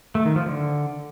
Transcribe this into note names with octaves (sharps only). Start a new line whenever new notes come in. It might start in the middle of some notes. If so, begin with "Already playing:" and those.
A3
D#3
F3
D3